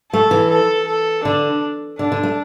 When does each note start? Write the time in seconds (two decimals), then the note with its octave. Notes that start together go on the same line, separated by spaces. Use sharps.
0.12 A3 A4
0.31 E3
0.50 A4
0.88 A4
1.24 D3 D4
1.99 D3 D4
2.12 D3
2.23 A3